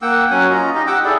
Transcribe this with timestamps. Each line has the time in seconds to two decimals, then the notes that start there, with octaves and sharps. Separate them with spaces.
0.02 A#3 F#5 G5 E6
0.31 F#3 C#4 F#5 G#5
0.50 C#4 F4 D#5 A#5
0.75 D#4 G4 D#5
0.87 F#5 G5 D6 E6
1.05 E4 G#4 A4 D5